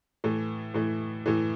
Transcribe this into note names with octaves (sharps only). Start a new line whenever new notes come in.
A2 E3 A3
A2 E3 A3
A2 E3 A3